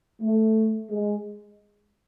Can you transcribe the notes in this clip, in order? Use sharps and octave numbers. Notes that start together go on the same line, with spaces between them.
A3
G#3